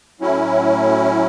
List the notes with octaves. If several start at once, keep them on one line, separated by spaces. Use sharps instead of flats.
A2 F#3 C#4 E4